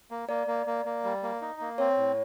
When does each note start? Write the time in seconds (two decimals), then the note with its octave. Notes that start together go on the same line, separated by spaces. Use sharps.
0.11 A#3
0.29 A#3 D5
0.47 A#3
0.66 A#3
0.85 A#3
1.04 G3
1.23 A#3
1.41 D#4
1.61 A#3
1.78 C4 C#5
1.97 A2